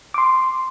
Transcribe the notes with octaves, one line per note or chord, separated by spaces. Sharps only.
D6
C6